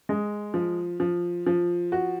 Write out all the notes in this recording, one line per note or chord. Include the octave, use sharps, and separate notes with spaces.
G#3
F3
F3
F3
F#4